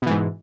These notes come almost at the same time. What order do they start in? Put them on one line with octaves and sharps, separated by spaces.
B2 E3 G#2